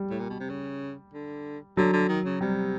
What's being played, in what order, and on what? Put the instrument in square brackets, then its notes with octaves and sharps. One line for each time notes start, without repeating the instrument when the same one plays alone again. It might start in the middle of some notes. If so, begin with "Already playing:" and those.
Already playing: [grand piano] G3
[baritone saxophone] A2
A#2
B2
C3
C#3
D3
[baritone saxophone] D3 [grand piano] F#3
[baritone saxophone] D3
D#3
C#3
[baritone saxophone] C3 [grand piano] G3